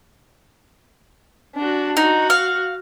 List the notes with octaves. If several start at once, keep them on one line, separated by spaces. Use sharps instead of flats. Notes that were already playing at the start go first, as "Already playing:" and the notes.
D4 F#4
D#4 F#4
F5